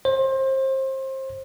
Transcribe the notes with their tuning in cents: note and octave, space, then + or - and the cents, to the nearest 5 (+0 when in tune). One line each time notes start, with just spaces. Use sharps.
C5 +25